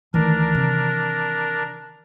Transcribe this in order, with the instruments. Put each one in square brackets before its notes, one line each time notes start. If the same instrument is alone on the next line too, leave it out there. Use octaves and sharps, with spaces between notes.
[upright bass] D2 [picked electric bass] D#3 E3 [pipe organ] D4 A#4
[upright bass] C3